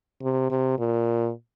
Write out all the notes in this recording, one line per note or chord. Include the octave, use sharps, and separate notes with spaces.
C3
C3
A#2